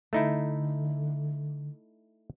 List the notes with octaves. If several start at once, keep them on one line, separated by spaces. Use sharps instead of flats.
D3 A3 D#4 E4